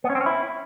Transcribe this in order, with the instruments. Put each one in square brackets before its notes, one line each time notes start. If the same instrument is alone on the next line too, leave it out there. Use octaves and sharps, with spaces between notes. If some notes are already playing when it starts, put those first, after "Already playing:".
[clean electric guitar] B3
C#4
C4
C#4
E4